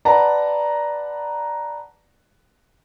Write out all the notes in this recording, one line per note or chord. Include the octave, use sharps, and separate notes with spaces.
B4 D5 F#5 A5 A#5